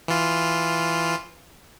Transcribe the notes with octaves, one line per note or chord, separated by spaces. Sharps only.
E3 F4